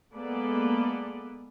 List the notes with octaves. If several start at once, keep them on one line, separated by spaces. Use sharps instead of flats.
G#3 A#3 B3 A4 B4 D5